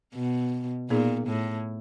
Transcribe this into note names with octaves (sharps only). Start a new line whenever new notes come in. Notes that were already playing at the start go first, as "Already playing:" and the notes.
B2
A#2 B3 D#4 G#4
A2